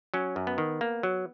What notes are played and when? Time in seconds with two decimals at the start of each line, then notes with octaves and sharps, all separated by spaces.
0.14 F#3 C#4
0.36 F#2
0.47 B3
0.58 D#3
0.81 A#3
1.03 F#3